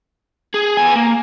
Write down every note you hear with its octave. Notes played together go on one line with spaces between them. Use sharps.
G#4
B3 G#5
A#3